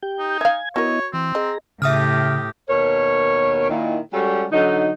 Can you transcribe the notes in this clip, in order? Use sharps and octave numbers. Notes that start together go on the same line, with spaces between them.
G4 G5 G6
D#4
E5 F5 G#5 G#6
B3 E4 F#4 A#4 C#5 D#5
E3 C4
G#4 D#5 A#5
A2 C#3 G4 E5 D#6 F6
D#2 B2 A#4 C#5
A#2 D#3 E4
G3 G#3 C#4 F#4 G#4 A4
D3 F#3 D#4